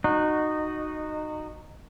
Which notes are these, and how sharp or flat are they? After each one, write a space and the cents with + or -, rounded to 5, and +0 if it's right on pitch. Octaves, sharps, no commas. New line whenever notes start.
D#4 -20 F#4 +0